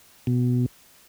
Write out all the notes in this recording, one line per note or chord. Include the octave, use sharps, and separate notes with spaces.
B2